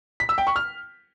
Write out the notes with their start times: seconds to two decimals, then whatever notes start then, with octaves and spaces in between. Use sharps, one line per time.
0.20 B6
0.29 E6
0.38 G5
0.47 C#6
0.56 F6